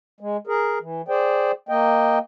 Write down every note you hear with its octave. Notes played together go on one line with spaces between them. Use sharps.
G#3
G#4 A#4
E3
G#4 C5 D5 G5
A#3 D#5 G5